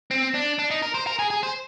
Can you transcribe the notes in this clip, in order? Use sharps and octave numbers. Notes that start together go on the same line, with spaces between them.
C4
D4
D4
D#4
A#4
C5
A#4
G#4
G#4
C5